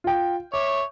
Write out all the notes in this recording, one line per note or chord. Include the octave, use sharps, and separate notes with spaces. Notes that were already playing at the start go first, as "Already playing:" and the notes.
F4 G5
C#5 E5 D6